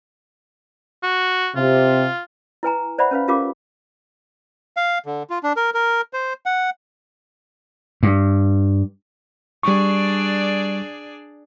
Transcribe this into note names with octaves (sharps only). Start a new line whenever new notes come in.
F#4
C3 F4
E4 B4 G#5 A#5
C5 D5 E5 F#5 B5
C#4 B4 F5
C#4 F4 G4 A#4 F5 D6
F5
D3
F4
D4
A#4
A#4
C5
F#5
G2
G3 D4 G#4 D5 C#6